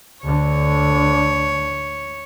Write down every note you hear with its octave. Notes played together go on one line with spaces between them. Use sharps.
D2 D3 C#5